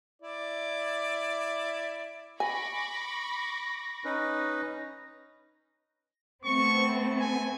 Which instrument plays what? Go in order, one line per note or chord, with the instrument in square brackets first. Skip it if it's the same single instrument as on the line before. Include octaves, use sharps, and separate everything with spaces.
[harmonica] E4 D5
[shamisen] G#5 [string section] B5 C#6 D6 [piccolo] A#6
[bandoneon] C#4 D#4 B4
[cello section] A3 B3 C4 [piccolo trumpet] C#6
[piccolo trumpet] G#5